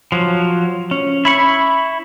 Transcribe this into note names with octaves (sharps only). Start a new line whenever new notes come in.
F3 F#3
C#4
E4 B5 C#6